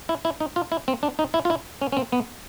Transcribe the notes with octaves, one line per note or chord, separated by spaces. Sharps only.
E4
E4
D#4
F4
E4
C4
D4
D#4
E4
F4
E4
C#4
C#4
C4
B3